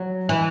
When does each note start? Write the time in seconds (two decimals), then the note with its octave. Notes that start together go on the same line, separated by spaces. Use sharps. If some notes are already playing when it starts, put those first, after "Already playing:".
Already playing: F#3
0.29 E3